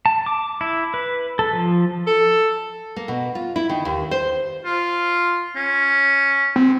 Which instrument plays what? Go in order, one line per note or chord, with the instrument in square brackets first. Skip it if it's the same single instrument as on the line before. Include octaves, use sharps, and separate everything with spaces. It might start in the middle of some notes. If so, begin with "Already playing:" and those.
[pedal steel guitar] A5
D6
E4
B4
A4
F3
[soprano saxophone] A4
[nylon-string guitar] A#3
B2
F4
E4
D#3
D#2
C5
[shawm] F4
C#4
[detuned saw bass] C4